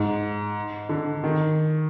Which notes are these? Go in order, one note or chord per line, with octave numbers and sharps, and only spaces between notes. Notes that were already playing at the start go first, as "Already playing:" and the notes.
Already playing: G#2
D3
D#3